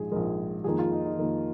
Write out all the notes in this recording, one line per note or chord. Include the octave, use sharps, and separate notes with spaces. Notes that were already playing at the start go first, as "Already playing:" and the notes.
Already playing: A#1 G#2 G#3 G#4
A#1 G#2 G#3 A#4
F2 D#3 A#3 G#4
F4
D#4
D#4
F2 D#3 A#3